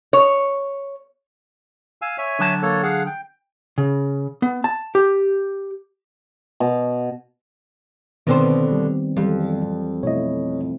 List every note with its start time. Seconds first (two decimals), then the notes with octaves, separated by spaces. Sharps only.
0.13 C#5
2.02 F5 G#5 E6
2.18 C#5 E5 G#5
2.39 D3 F#3 A5
2.62 A#3 A4 C#5
2.83 G#4 F5 F#5
3.06 G5
3.78 C#3
4.42 B3
4.64 A5
4.95 G4
6.60 B2
8.27 B2 D3 D#3 B3 C4 C5
8.72 G3
9.17 F2 E3 F#3 G3
10.03 B2 A3 E4 C#5 D#5